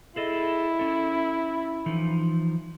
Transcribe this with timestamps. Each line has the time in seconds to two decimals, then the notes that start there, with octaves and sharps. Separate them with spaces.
0.16 E4 G#4 A4 D#5
0.79 C#4 A4
1.86 E3 F3 D#4